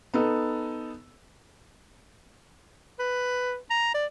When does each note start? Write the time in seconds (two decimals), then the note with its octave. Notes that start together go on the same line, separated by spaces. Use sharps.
0.14 B3 D#4 A4
2.99 B4
3.71 A#5
3.94 D5